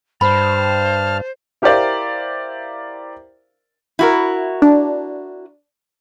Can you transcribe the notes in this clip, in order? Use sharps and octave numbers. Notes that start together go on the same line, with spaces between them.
G2 C5 A5 B5 F6
E4 G4 A#4 C5 D5 F5
E4 F#4 A#4
D4